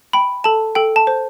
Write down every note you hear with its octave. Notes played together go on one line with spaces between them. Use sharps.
G5 B5
A4 A5
A4 G5
A5
C5